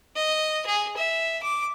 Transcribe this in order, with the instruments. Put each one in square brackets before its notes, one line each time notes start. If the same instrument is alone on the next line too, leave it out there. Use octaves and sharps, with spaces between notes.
[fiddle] D#5
G#4
E5
D6